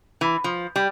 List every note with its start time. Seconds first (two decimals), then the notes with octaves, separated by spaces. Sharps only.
0.21 E3
0.44 F3
0.76 G3